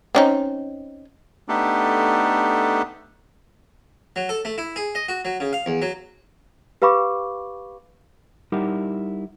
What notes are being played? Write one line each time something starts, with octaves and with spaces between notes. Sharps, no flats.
C4 C#4 D#4
A3 B3 D4 D#4 G4 A4
F#3
A4
A3
E4
G#4
D#5
F#4
F#3
C#3
F5
E2
F#3
G4 B4 F5 B5 C#6 D6
G3 D#4 E4 G4 A#4 F#5